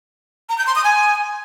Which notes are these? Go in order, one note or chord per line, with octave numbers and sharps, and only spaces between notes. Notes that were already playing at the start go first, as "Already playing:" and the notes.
A#5
G6
C6
D#6
G#5